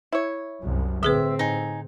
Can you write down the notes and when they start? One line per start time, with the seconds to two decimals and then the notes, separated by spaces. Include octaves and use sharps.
0.12 E4 C#5
0.62 C2 F#2
1.03 A2 D3 C4 G#4 B4 E5
1.39 D#4 G#5